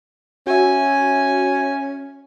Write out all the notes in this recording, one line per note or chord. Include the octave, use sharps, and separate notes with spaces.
C#4 F#4 E5 G#5